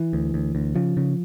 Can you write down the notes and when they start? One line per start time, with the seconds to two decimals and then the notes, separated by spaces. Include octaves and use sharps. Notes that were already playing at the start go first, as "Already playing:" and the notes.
Already playing: E3
0.13 D2
0.34 D2
0.55 D2
0.75 C#3 F3
0.97 C#3